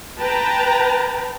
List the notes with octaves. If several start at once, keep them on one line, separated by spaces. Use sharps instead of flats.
B4 G5 A5 A#5